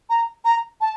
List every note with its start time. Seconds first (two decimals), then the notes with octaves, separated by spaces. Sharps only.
0.10 A#5
0.45 A#5
0.81 A5